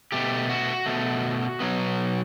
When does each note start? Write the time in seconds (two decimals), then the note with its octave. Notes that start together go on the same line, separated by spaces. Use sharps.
0.12 B2 A3 G4
0.50 F#4
0.86 B2 A3
1.60 B2 F#3 B3